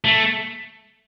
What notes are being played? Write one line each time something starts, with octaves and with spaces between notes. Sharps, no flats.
A3